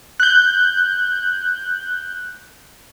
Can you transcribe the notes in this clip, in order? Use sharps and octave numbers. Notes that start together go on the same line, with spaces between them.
F#6 G6